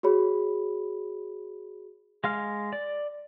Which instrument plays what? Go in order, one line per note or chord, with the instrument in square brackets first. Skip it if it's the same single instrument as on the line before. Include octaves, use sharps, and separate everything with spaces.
[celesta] F#4 G#4 C#5 B5
[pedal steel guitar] G#3 F5 F6
D5